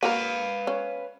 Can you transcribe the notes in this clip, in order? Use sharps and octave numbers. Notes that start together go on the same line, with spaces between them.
A#3 F#4 A#4 B4 F5
C#4